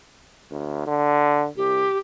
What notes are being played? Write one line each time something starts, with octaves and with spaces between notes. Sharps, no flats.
D2
D3
C2 G4